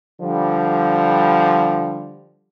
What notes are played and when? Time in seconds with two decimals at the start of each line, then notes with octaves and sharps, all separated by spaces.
0.21 D3 F3 G3